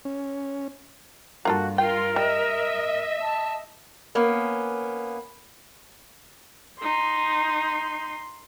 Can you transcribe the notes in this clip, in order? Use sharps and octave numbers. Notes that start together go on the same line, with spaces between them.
C#4
G2 A#3 F4 F#4 A4
F4 A#4 G5
G3 D#5 E5
A5
A#3 B3 C#4
D#4 C6